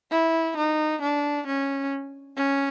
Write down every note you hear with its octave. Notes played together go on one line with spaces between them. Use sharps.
E4
D#4
D4
C#4
C#4